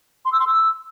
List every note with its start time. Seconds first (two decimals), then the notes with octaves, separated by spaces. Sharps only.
0.25 C6
0.32 E6
0.40 C6
0.47 E6